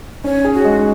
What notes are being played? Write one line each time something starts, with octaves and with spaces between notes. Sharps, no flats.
C#4 C#5
G#4
F#4
G#3